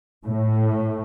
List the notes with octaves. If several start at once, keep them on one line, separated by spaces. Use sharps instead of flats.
A2